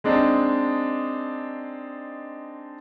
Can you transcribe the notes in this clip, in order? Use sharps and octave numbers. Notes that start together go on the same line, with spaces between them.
G#3 C4 D4 D#4